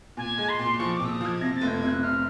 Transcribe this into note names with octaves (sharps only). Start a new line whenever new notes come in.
A#2 G#5
G#3
C6
A#2
F3 C#6
D6
A#2 E6
D#6
F3 G#6
C3 A#6
F1 A6
G6
G#6
C3
F#6
C3 F6